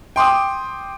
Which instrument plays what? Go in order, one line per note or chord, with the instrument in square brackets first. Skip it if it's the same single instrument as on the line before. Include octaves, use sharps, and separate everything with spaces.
[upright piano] G5 C6 D6 D#6